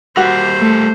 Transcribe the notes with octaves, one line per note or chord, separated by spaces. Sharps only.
G3 A#3 F#4 C5
A3